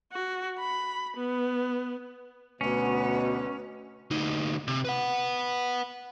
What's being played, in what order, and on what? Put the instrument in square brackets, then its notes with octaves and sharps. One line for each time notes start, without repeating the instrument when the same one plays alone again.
[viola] F#4
B5
B3
[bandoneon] D2 [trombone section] B2 [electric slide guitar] C#4 [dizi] B4
[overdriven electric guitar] D2 D#4
C3
B4 F#5